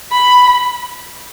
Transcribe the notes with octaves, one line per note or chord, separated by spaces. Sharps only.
B5